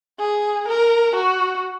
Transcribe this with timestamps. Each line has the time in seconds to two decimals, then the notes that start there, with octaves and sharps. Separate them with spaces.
0.19 G#4
0.68 A#4
1.16 F#4